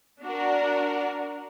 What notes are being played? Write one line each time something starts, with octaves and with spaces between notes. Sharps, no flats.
D4 F#4 A#4